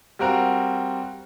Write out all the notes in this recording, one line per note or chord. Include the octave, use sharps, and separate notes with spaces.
G3 C4 F#4 A#4 F5